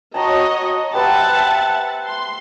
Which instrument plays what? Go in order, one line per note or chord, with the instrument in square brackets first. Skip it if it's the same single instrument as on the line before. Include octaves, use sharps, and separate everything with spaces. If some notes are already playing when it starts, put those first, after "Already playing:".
[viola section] F#4 C#5 D#5 [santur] A5 A#5
[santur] G4 B4 C5 [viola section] E5 F#5 A5
[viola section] C6